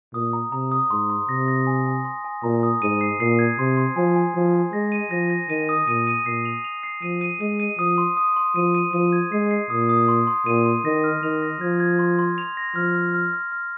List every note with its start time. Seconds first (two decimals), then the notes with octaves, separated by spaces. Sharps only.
0.14 A#2 D#6
0.33 A#5
0.52 C3 A#5
0.72 D#6
0.90 G#2 C6
1.10 C6
1.29 C3 A#6
1.48 A#6
1.67 G#5
1.86 G#5
2.05 C6
2.24 G#5
2.43 A#2 A#5
2.63 D#6
2.82 G#2 D#7
3.01 C7
3.20 A#2 C7
3.39 G#6
3.59 C3 C6
3.77 C6
3.96 F3 G#5
4.16 G#5
4.35 F3 G#5
4.54 G#5
4.73 G#3 A#6
4.92 D#7
5.11 F3 A#6
5.30 A#6
5.49 D#3 D#7
5.69 D#6
5.88 A#2 D#7
6.07 D#7
6.26 A#2 C7
6.45 F7
6.64 F7
6.83 C7
7.02 F3 D#7
7.21 D#7
7.41 G#3 D#7
7.60 D#7
7.78 F3 D#6
7.98 C6
8.17 D#6
8.36 C6
8.55 F3 D#7
8.75 D#7
8.93 F3 D#7
9.12 G#6
9.32 G#3 C7
9.51 C7
9.70 A#2 D#6
9.89 D#6
10.08 C6
10.27 C6
10.46 A#2 D#7
10.66 C6
10.85 D#3 A#6
11.04 F6
11.23 D#3 F7
11.42 A#6
11.61 F3 G#6
11.80 G#6
11.99 C6
12.19 C6
12.38 F7
12.57 A#6
12.76 F3 F6
12.95 F6
13.14 F6
13.33 F6
13.52 F6